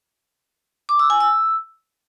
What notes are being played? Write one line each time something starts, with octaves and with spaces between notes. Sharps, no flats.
D6
E6
G#5
E6